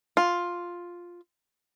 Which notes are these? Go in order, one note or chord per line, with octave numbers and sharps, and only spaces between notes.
F4